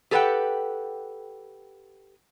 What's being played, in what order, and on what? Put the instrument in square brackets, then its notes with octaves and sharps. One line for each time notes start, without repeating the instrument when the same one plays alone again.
[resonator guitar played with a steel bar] G4 A4 B4 E5 F#5 G5